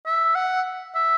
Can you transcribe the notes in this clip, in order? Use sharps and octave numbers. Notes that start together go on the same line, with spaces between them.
E5
F#5
E5